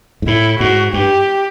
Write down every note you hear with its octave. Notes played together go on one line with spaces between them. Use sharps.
G#2
A2 E4
G#2 F#4
G2 G4